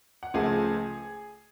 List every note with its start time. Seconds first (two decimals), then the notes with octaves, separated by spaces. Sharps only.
0.23 F#5
0.34 C#2 C#3 F3 A3 G#4 G#5